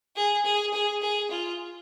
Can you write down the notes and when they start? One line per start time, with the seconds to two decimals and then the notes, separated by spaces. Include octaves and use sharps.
0.16 G#4
0.45 G#4
0.73 G#4
1.02 G#4
1.31 F4